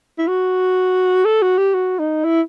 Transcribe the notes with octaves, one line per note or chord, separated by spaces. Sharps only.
E4
F#4
A4
F#4
G4
F#4
D#4
E4